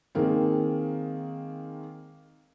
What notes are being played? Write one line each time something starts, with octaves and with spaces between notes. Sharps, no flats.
D#3 G#3 A#3 C4